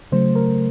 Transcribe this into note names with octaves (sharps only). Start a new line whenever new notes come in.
C#3 F#3 A3 C5
A#4